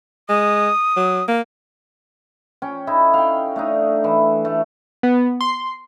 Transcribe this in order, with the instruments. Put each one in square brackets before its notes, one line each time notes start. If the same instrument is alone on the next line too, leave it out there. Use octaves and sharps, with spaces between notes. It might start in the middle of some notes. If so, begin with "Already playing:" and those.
[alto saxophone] G#3 [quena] D#6
[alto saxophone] F#3
A#3
[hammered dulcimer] C#4 G5
D#4 E4 A4
F5 G5
A3 D4 D#4
E3
A3
[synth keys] B3
C6